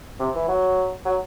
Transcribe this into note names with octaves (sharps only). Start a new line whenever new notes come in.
C3
E3
F#3
F#3